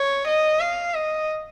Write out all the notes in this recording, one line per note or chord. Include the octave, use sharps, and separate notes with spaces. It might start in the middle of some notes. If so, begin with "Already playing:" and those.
Already playing: C#5
D#5
F5
D#5